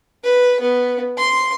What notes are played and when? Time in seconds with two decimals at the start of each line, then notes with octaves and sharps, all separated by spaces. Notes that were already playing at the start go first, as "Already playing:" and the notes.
0.24 B4
0.60 B3
1.18 C6